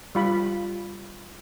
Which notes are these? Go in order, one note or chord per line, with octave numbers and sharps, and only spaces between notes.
G3 F4 B5